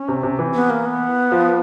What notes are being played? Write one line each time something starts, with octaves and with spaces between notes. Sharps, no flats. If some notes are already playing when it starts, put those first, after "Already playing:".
Already playing: C#4
C3
C3
E3
B3
A#3
B3
F3